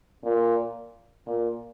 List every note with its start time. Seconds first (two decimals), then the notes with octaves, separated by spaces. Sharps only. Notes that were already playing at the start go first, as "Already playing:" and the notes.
0.24 A#2
1.27 A#2